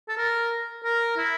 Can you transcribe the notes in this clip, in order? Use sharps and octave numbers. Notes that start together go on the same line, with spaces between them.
A4
A#4
A#4
E4